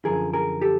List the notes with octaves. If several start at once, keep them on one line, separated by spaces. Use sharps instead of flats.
F#2 D3 F3 G#4 A#4
G#4 A#4
G4 A4